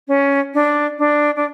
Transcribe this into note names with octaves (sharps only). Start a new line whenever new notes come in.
C#4
D4
D4
D4